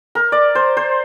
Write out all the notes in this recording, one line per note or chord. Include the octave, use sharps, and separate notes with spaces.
A#4
D5
C5
C5